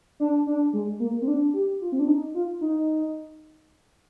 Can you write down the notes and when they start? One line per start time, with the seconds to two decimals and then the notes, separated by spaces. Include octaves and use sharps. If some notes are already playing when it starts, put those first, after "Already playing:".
0.20 D4
0.47 D4
0.73 G#3
1.00 A#3
1.22 C4
1.28 D4
1.54 G4
1.81 F4
1.92 C4
1.99 D4
2.08 D#4
2.34 F4
2.61 D#4